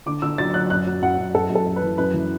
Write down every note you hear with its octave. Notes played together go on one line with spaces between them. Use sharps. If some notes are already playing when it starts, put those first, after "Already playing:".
D3 D6
D3 E6
F#3 A6
F#3 F#6
F#2 F#6
F#3
F#2 F#5
F#2
F#2 A4
F#2
A4
F#2
B4
E3
F#2 B4
E3